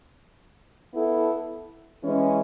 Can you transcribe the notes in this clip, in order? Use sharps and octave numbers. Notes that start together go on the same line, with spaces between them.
B3 E4 A4
E3 G#3 C#4